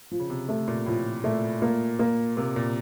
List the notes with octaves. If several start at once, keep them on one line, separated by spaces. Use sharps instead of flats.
F3
C#3
C3
C3 A3
A#2
A2 F3
A#2 A3
A#2 A#3
A#2 A#3
C3 A#3
A#2